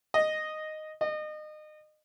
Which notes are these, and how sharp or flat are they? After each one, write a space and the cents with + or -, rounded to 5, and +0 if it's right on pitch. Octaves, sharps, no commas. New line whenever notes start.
D#5 -5
D#5 -30